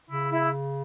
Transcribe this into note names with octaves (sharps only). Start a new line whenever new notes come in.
C#3 E4
E4